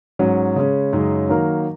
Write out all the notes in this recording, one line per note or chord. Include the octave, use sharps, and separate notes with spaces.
G#2 F#3 C#4
C#3 G#3 C#4
F#2 C#3 G#3 D#4
D#3 F#3 A#3 D#4 A#4